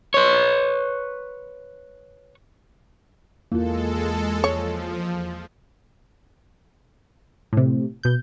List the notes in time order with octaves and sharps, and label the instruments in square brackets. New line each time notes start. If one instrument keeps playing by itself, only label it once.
[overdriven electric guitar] B4 C#5
[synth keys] E2 [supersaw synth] G#3 A4 [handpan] A#3 F4
[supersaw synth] F3 [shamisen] C#5
[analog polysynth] A2 C3
B2 G6